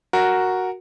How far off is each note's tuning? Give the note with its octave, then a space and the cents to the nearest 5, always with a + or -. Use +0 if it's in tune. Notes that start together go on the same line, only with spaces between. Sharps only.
F#4 +0 A#4 +0